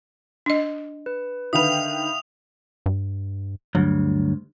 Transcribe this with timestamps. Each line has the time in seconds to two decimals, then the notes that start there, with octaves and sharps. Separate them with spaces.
0.46 D4 D#5
1.06 B4
1.53 D3 D#3 B4 E5 F5 D#6 F7
2.86 G2
3.75 D2 G2 F#3